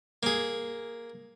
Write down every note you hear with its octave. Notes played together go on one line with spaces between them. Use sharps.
A#3 G#4